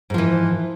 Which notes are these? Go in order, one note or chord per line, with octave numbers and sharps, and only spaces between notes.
G#2 E3 F3